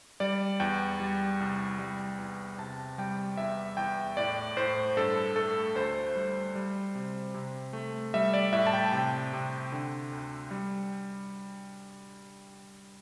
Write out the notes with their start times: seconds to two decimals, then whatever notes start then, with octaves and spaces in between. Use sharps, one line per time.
0.20 G3 D5
0.60 E2 G5
1.00 G3
1.40 C2
1.79 G3
2.18 E2
2.58 C3 A5
2.98 G3 G5
3.37 E2 E5
3.77 E2 G5
4.17 A2 D5
4.57 A2 C5
4.97 G2 A4
5.36 A3 A4
5.75 D2 C5
6.16 G3
6.55 G3
6.95 C3
7.34 C3
7.73 A3
8.14 G3 E5
8.34 D5
8.53 A2 E5
8.67 A5
8.73 G5
8.93 C3 G5
9.33 C3
9.72 D3
10.12 D2
10.51 G3